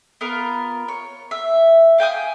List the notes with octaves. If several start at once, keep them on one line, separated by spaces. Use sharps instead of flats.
B3 F4 A#4
C#5
E5
F5 G5 G#5 D#6